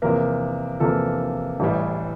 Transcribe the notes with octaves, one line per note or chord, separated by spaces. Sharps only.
E2 C3 F3 A#3 A#4
E2 C3 F3 A#3 A4
A1 A2 E3 G3